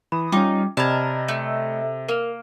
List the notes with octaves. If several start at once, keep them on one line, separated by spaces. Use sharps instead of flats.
E3 B5 D#6
G3 C#4 D#4 F4 G5 D6
C3 A#4 D5 D#5 A5 B5 G#6
A3
A#3 A#4 F7